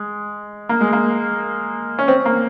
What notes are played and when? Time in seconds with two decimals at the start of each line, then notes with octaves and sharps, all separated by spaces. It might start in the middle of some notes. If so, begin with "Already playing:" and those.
Already playing: G#3
0.69 A#3
0.81 G#3
0.93 A#3
1.99 C#4
2.08 C4
2.25 A#3